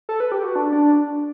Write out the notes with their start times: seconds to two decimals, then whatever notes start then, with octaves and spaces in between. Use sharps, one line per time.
0.09 A4
0.20 B4
0.32 G4
0.43 F#4
0.55 D4
0.72 D4